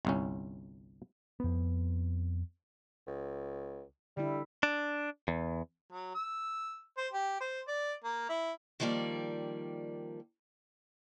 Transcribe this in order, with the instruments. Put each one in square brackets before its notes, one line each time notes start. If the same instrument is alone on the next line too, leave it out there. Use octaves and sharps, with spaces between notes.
[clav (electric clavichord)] G1 C2 C#4
[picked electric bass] F2 B3
[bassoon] C#2
[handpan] D3 E4 [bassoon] G3
[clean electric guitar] D4
E2
[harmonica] F#3
E6
C5
G4
C5
D5
A#3
E4
[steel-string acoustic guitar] D#3 F3 G3 A#3 D5